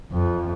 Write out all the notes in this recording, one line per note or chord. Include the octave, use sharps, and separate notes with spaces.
F2